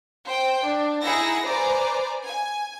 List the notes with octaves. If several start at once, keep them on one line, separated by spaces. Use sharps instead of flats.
C5 G5
D4
D#4 E4 G#4 F#5 E6 A#6
B4 C5 D5 G#5 A#5
G#5